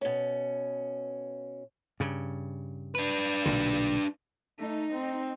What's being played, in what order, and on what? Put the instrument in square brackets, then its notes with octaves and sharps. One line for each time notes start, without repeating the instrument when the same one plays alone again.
[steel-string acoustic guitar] B2 C#4
[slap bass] G2 C#3
[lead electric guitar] D4 B4
[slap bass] B1 A#2 D3
[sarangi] A3 [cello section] D#4
[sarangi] C4